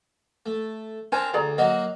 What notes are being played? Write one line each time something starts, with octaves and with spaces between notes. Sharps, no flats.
A3
C4 D4 A#4 C5 G#5
D2 G#4 D5 A#5
F#3 A#3 F#4 D#5